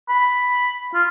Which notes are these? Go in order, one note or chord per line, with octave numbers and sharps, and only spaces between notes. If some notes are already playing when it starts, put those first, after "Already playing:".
B5
F4